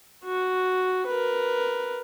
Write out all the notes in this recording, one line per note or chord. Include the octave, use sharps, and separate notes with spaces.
F#4
A#4 B4